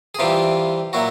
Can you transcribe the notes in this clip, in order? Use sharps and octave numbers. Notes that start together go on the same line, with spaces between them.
G#4
C3 E3 G3 F4 G4
A#2 F#3 E4 F#4